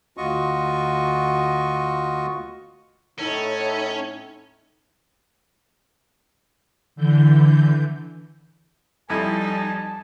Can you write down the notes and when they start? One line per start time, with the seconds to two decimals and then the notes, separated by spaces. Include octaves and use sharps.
0.17 D2 F4 F#4 D#5 C#6
3.19 A2 C#4 D#4 A4
6.96 D3 E3 G6
9.10 F2 G3 D#4 E4 G#5 A5